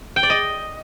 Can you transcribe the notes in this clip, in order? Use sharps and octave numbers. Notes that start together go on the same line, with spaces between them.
G5
D5
D#5